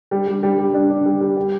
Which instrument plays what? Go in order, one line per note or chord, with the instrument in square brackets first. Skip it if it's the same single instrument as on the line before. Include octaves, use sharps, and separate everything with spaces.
[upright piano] G3
G3
G3
G3
D4
D4
G3
G3
G4